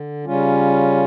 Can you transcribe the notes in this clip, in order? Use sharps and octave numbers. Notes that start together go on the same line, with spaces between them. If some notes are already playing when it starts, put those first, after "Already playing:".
Already playing: D3
C#3 G3 C#4 F4